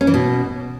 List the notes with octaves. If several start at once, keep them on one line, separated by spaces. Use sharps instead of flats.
C#4
E3
B2